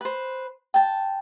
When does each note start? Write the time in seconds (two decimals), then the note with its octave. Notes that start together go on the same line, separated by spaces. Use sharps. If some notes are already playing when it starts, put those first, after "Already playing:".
0.01 B4 C5
0.74 G5 A5